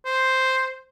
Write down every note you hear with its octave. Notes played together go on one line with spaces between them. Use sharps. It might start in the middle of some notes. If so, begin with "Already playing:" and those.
C5